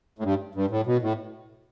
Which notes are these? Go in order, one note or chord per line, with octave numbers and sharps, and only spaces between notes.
A2
G2
G2
A2
B2
A2